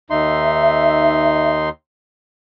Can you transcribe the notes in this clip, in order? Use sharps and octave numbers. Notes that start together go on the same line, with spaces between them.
D#2 D#4 E5 C6